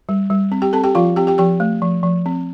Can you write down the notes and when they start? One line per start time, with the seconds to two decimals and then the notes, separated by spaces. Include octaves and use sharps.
0.09 G3
0.30 G3
0.52 C4
0.62 G4 G5
0.73 C4 A4 A5
0.84 G4 G5
0.95 F3 F4 F5
1.16 C4 G4 G5
1.27 G4 G5
1.38 F3 G4 G5
1.60 A3
1.82 F3
2.03 F3
2.26 C4